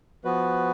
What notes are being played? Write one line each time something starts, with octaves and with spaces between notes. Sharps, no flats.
F3 B3 F#4 B4